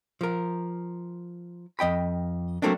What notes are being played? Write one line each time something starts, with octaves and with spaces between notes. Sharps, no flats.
F3 A#4
F2 D#5 G5 B5
F#3 A3 A#3 C4 D4